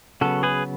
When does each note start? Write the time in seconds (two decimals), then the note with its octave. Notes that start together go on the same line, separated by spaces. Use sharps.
0.21 C#3 F#3 B3 F#4 A4
0.43 G#4 B4